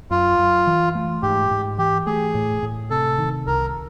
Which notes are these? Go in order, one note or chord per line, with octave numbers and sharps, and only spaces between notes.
F#2 F4
F#2
E3
A3
G#2 G4
G#2
E3 G4
A3 G#4
A2
A2
C3 A4
D#3
C2 A#4